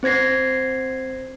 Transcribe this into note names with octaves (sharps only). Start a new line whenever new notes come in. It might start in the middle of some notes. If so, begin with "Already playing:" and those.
C4 C5 G#6 A#6 C7